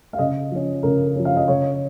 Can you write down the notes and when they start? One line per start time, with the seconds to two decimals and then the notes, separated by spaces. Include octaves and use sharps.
0.13 F5
0.18 C#3 D#5
0.51 F3 C#4
0.83 C#3 A#4
1.16 F3 C#4
1.25 F5
1.36 D#5
1.48 C#3 C#5